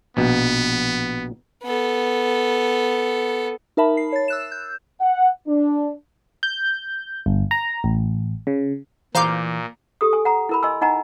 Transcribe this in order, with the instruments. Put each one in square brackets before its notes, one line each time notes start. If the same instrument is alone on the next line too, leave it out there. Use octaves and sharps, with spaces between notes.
[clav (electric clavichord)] A#1 B2 [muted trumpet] B3
[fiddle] B3 A4
[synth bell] D#4 A#4 E5 A5 B5
C7
C#5 A6
E6 F#6 E7
G6
[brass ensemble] F#5
D4
[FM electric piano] G6
G1
A#5
A1
C#3
[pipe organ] A#2 [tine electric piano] E3 [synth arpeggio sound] C5 F5 G6 [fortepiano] A#5 D6
[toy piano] G4 A4 D#6
G#5
F#5 A#5
E4 A#4 B5
D#5 G#5 C6 E6
D#4 D#5 F#5 G#5 A#5